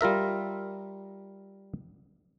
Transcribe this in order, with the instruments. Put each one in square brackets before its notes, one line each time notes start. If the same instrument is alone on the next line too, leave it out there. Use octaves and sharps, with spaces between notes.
[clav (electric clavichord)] G3 F4 A#4 E5